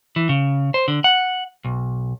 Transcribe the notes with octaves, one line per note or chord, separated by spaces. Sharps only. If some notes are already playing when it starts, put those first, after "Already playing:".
E3
C#3
C5
D3
F#5
B1